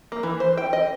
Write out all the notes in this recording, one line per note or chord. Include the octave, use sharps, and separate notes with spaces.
A#3
E3
C5
G5
D#5